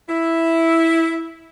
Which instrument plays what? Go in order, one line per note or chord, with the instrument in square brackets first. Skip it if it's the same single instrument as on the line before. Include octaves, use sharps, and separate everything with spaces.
[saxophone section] E4